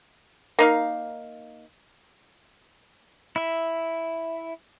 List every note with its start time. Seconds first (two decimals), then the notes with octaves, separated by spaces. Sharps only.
0.59 A#3 D#4 F5
3.36 E4 E5